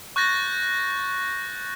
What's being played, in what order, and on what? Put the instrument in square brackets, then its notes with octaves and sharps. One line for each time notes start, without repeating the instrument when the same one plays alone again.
[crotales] C#6 F#6 G6 A6 A#6